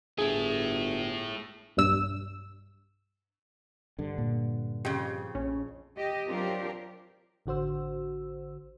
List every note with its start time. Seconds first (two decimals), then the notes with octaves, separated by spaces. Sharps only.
0.18 G1 A3 E4 G#4
1.77 B1 G2 E6
3.99 G2 D3
4.18 A#2
4.85 F2 C#3 G4
5.35 A#1 C#4
5.97 G4 D#5
6.29 F#3 C4 D4 F4 G4 A#4
7.46 A1 D3 F#4 C5 E6